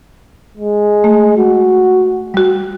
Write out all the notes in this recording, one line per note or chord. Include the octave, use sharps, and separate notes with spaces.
G#3
A3
F#4
G3 F#4